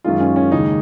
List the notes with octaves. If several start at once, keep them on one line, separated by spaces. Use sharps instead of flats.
F#2 D#3 G#3 F4
C#4
C#4
D#2 C#3 G#3 D#4